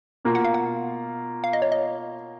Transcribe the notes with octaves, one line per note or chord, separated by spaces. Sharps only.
B2 A#3 F4
F#5
F5
F#5
F5
D#5
C#5
D#5